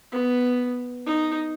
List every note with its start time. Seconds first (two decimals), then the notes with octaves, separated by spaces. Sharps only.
0.12 B3
1.06 D#4